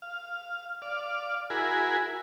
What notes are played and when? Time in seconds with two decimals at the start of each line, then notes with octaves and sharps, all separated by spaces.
0.02 F5
0.82 D5 F5
1.50 E4 F#4 G#4 A#4 G#5 B5